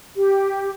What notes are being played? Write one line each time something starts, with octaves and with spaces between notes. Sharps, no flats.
G4